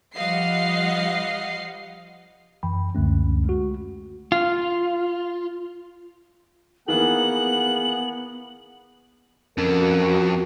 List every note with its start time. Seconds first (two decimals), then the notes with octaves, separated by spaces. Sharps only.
0.15 F3 G3 D#5 F5 F#5 C7
2.63 F#2 E3 G5 B5
2.95 C#2 F#2 D3 A3 C#4
3.46 G#3 F#4
4.32 F4
6.88 D#3 E3 A#3 B3 G#4 F5 F#5 F#7
9.58 F2 C#4 F#4 A#4